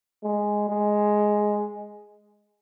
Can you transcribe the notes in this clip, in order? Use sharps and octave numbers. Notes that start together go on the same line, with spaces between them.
G#3
G#3